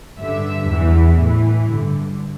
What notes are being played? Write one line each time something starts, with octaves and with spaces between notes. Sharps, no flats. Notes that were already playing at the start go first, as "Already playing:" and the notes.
G2 D3 E5
E2 E3
A2 E3
G2 D3